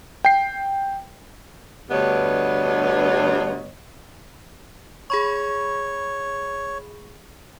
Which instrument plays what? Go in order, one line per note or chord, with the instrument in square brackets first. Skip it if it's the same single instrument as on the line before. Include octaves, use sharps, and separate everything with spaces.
[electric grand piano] G5 C7
[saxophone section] D2 G2 G3 B3 C#5 D#5
[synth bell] G#4 B5 C#6 [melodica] C#5